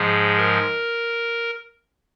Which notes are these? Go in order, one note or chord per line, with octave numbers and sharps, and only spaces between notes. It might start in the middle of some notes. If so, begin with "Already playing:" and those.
Already playing: G#2 F3 G#3 G#4
A#4